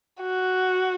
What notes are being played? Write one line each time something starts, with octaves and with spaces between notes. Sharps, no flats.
F#4